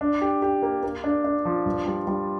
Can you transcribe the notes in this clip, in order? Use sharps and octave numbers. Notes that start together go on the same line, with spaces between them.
D4
G4
G4
A#3
A#3
D4
D4
F3
G2
G3
G3